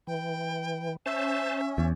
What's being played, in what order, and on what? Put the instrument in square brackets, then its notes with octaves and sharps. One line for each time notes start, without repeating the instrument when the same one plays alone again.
[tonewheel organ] E3 [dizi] G5
[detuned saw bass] C#4 [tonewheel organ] C5 A5 [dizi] E5
[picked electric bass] E2